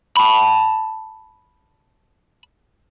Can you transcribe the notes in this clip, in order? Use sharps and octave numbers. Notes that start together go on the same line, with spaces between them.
A5 B5